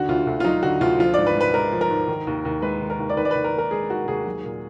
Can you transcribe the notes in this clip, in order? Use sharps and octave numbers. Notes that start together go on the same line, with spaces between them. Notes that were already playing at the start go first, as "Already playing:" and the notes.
Already playing: D#2 D3 F#4
D2 F4
D2
F4
F#3 D#4
D3 F#4
D2 F4
F3 F4
G#2 D5
B4
G#2
B4
G#3 A#4
F3
A#4
G#2
D#3
D#2
D#2
G#3 B4
D#3
A#4
D#2
D5
D#3 B4
D5
D#2 B4
A#4
D#2
A#4
G#3 G#4
D#3 F#4
D#2 G#4
F#3
A#2